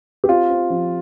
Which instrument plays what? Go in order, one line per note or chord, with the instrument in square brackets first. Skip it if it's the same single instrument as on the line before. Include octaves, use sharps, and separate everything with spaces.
[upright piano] G4
C4 F4
C4
F3